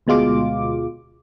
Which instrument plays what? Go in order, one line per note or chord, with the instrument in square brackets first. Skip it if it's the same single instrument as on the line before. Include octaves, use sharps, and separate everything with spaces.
[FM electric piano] D2 B2 G#3 F4 D6